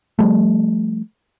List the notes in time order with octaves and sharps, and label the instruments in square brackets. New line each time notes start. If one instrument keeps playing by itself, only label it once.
[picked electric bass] F3 G3 A3